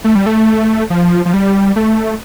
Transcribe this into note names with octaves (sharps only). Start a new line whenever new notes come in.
A3
G3
A3
F3
F3
G3
A3